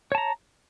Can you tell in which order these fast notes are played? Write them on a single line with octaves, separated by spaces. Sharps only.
C#5 A5 A#5